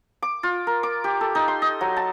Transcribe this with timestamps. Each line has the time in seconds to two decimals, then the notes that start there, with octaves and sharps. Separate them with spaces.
0.22 D6
0.43 F4
0.67 A#4
0.83 D6
1.04 G4
1.21 A4
1.35 D#4
1.48 C6
1.62 D#5
1.81 F#3
1.97 A5